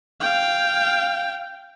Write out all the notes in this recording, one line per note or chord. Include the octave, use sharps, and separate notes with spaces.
F5 G5